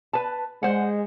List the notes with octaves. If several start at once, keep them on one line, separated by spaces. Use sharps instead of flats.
B4 A5
G#3 C5 F#5